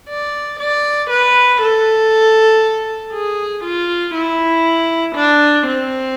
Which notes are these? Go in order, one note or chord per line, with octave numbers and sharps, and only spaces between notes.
D5
D5
B4
A4
G#4
F4
E4
D4
C4